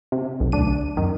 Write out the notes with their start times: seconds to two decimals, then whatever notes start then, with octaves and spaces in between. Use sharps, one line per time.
0.12 C3
0.40 B1
0.52 D2 D4 D#7
0.97 F#2 D#3